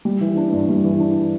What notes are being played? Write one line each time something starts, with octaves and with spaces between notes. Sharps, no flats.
G3
E3
D4
G2
G3
E3
D4